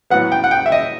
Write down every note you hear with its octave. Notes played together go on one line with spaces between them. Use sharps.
A2 F#3 B3 F#5
G5
F#5
G5
E5
D#5